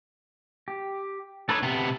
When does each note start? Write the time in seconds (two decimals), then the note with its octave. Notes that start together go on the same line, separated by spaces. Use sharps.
0.68 G4
1.49 D4 D#4 A4 B4 C#5
1.63 C3 B3 A5